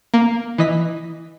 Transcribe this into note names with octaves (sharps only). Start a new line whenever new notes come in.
A#3
E3 D#5 B6